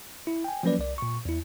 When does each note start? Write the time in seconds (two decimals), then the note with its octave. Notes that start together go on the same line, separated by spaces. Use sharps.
0.27 E4
0.44 G5 G#5
0.63 F3 F#3 A#3 C#4 B4 D5
0.79 C2 D5
0.98 A#2 C#6
1.25 E2 E4